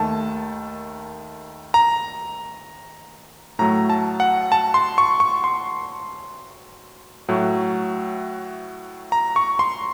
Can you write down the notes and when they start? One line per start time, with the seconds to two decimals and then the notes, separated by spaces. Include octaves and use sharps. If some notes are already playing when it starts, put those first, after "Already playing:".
Already playing: D#2 D#3 A3 A5
1.74 A#5
3.59 A2 F#3 A3 A#5
3.90 A5
4.20 F#5
4.52 A5
4.74 C6
4.98 C#6
5.20 C#6
5.44 C6
7.29 A2 F#3 A3
9.12 A#5
9.36 C#6
9.59 C6